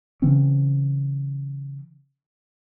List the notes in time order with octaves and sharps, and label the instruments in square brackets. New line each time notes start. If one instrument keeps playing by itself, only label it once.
[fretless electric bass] C#3 E3 C4 C#4